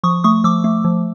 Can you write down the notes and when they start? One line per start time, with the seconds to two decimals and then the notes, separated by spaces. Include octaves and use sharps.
0.03 F3 C#6 D#6
0.24 A3 C#6 D#6
0.44 F3 D6 E6
0.64 A3
0.85 F3